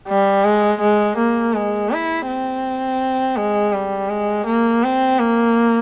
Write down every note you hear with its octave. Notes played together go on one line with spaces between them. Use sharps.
G3
G#3
G#3
A#3
G#3
E4
C4
G#3
G3
G#3
A#3
C4
A#3